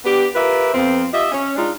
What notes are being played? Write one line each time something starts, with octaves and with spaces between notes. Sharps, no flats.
B3 D4 G4
F4 G4 A#4 B4 E5
F2 F3 B3 C4
F4 G4 D#5 E5
C#4
G#3 D4 D#4 F4